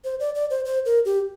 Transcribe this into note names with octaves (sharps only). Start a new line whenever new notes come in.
C5
D5
D5
C5
C5
A#4
G4